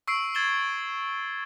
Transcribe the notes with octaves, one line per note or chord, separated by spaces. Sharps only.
C#6 E6 C7 D7
G#6 A6 E7 G7